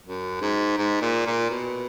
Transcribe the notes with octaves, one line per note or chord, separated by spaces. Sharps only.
F#2
G#2
G#2
A#2
A#2
B2